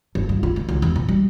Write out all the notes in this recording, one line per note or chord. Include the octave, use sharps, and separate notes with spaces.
G1
G2
F4
D#3
C#2
E2
A#2
G3